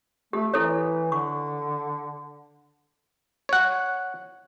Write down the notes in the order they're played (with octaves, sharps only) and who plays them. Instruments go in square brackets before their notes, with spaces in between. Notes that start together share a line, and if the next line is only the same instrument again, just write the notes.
[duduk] A3 [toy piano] G4
[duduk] E3 [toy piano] E4 A4 C#5
[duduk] D3 [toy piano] C#6
[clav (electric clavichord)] C#5 F#5